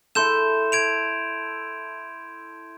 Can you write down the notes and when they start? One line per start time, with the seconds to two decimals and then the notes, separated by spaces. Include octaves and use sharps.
0.15 E4 A4 C6 G6 E7
0.72 G#6 D7 F7